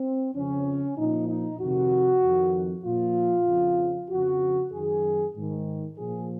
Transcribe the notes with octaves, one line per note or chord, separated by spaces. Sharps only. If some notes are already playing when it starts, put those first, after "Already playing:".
Already playing: C4
F2 C#3 F3 C#4
A#2 F3 D#4
D#4
F2 C3 D#3 F#4
F2 D#3
A#2 F3 F4
F2 C#3 F3
F2 C#3 F3 F#4
F#2 D#3 G#4
G#2 D#3
A#2 F3 G#4